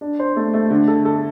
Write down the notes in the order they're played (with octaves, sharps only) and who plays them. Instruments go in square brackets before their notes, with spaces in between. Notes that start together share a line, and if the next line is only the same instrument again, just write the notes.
[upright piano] D4
C5
A3
A3
D3
A4
A4